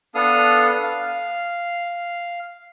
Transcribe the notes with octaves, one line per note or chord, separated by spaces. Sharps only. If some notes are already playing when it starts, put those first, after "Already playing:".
B3 D4 A4 F5 D#6 F6
F5